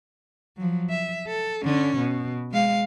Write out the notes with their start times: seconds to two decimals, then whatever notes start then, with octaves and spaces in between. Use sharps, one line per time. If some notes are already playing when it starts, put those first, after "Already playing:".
0.57 F3 F#3
0.90 E5
1.27 A4
1.65 D3 C#4
1.97 B2
2.52 G#3 F5